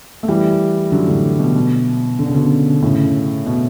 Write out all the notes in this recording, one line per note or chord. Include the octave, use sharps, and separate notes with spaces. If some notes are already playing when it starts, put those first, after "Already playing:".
A3
E3 G3
D3 F#3
A2
B2
B2
D3
C#3
B2 D3
A2 C#3
B2